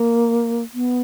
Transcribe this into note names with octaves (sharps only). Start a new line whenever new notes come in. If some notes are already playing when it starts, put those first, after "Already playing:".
Already playing: A#3
B3